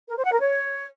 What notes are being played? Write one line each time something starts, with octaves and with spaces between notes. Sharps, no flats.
A#4
C5
F#5
A#4
C#5